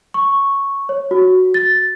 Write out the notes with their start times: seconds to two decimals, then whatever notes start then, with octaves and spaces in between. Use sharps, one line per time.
0.14 C#6
0.89 C#5
1.11 F#4
1.54 A6